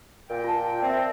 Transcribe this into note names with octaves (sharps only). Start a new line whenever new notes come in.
A#2 G5
F4 A5
C4 D5 E5 G5